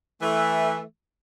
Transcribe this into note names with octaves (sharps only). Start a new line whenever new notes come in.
E3 A3